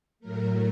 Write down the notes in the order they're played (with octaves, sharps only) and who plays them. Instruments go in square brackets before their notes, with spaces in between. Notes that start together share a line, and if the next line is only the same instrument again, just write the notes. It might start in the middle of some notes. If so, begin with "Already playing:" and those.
[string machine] A2 F#3 A3 A#4